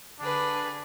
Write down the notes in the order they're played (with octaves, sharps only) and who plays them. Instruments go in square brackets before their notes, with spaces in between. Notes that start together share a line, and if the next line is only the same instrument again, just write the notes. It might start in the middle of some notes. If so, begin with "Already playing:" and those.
[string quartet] D3 G#4 B4 [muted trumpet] D4